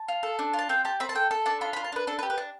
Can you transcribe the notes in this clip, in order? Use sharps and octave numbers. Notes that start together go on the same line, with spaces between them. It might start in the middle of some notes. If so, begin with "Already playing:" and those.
Already playing: A5
F4
A4
D4
F4
A5
C4 G5
G4 A5
C4 B5
A5
A4 G5
A4 A5
D4 A5
F4 B5
B5
F4
A5
D4 B4
D4 A4
B4
G4
B4
D4